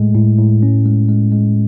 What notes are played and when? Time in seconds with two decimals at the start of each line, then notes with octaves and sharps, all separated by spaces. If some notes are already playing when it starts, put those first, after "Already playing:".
Already playing: A2 G#3 A3
0.15 A2
0.38 A2
0.63 C#4
0.86 G#3
1.09 G#3
1.32 G#3